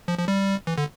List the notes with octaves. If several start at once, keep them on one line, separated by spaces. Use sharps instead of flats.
F3
F3
G3
E3
D3